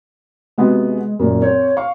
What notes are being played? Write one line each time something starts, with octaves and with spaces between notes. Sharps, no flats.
C3 G#3 B3 F#4
F#2 A#2
C4 C#5
F5 C#6